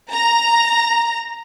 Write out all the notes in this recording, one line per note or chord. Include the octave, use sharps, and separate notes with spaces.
A#5